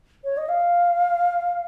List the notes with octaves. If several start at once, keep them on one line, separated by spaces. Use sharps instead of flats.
C#5
D#5
F5